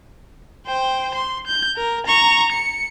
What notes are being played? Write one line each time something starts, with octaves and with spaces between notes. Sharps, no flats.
C5 G5
C6
G6
A#4
A#5 C#6
C#7